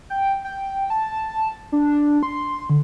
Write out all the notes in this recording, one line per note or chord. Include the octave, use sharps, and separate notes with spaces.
G5
G5
A5
D4
C6
D3